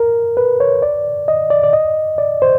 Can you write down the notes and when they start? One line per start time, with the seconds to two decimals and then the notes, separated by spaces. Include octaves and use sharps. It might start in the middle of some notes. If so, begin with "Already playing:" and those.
Already playing: A#4
0.37 B4
0.60 C#5
0.82 D5
1.28 D#5
1.50 D5
1.63 D5
1.73 D#5
2.18 D5
2.42 C5